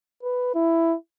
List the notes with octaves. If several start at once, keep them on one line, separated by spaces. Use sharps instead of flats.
B4
E4